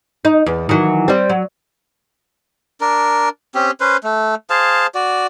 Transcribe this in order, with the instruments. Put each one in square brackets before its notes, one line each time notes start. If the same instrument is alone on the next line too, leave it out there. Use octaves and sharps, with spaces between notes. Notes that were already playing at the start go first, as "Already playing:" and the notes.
[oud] D#4
E2
D#3 E3 F#3
G3 C4
F#3
[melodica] D4 A#4
C4 C#4 G4
C#4 B4 C5
A3
G#4 C5 F5 A5
F#4 D5